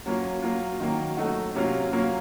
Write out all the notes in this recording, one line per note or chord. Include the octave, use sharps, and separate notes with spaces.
F#3 A#3 C#4 F4
F#3 A#3 F4
D#3 F#3 A#3
F#3 A3 D#4 F#4
C3 F#3 A#3 C#4 F4
F#3 A#3 C#4 F4